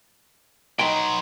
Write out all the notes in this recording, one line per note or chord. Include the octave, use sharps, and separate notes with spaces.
F#3 B3 D#4 G5 B5 C6